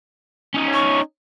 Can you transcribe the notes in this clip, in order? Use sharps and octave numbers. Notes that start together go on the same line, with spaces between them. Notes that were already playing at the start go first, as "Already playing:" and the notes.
C#4 D#4
C#6